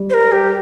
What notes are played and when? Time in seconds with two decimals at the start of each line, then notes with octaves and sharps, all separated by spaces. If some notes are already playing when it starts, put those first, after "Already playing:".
Already playing: G3
0.10 C5
0.14 A#4
0.32 G4